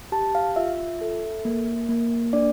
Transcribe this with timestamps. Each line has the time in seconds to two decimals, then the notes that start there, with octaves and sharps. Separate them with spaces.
0.12 G4 A5
0.35 F5
0.56 F4 E5
1.01 A4
1.45 A#3
1.89 A#3
2.33 D4 D5